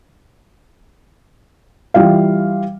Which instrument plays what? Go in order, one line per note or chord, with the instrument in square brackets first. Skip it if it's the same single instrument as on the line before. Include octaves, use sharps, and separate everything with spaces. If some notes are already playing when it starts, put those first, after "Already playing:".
[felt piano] E3 G3 F4 F5